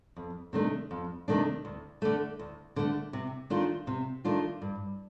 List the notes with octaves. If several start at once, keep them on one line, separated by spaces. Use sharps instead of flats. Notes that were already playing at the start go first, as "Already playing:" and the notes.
F2
C3 D#3 A3 D4
F2
C3 D#3 A3 D4
D2
D3 A3
D2
D3 A3
C3
D#3 A3 D4 F4
C3
D#3 A3 D4 F4
G2